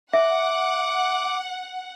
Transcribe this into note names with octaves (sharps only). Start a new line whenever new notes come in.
E5 F#5 D6